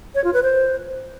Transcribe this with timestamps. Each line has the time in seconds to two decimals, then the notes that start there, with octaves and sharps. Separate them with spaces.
0.15 C#5
0.24 F4
0.34 B4
0.43 C5